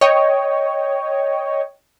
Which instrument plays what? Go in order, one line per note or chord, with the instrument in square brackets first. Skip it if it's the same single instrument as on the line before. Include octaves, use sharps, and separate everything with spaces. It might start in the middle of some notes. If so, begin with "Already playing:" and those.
[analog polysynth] C#5 D#5 G5